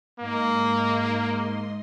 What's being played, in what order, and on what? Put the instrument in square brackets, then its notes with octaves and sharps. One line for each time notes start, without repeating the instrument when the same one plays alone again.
[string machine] G#2 D#5 C6 [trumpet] A#3